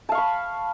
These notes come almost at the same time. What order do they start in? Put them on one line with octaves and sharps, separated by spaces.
A5 F5 C#6 B5